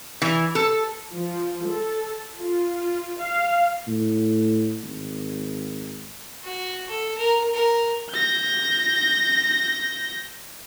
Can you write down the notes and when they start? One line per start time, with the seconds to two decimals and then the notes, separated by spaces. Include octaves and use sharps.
0.22 E3
0.55 A4
1.13 F3
1.67 A4
2.37 F4
3.24 F5
3.87 A2
4.83 G#1
6.43 F#4
6.89 A4
7.18 A#4
7.53 A#4
8.10 G6 A#6